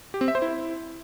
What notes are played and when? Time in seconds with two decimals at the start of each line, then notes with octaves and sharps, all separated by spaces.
0.14 G4
0.21 C4
0.28 E5
0.35 C5
0.42 E4